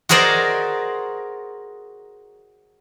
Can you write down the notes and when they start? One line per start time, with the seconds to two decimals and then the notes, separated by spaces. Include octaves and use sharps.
0.09 F#4 G#4 A#4 C5 D5 D#5